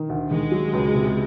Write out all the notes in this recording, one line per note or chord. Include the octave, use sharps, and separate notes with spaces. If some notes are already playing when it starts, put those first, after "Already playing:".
Already playing: D#3
D2
D#3 G#3
F#3
C#2
C3